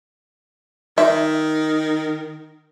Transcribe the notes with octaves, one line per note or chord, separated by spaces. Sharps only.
D#3 E5